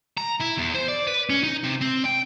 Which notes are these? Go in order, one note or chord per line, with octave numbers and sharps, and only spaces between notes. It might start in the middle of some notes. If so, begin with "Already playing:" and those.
A#5
E4
E2
C5
D5
B4
C#4
D#4
C3
C4
G5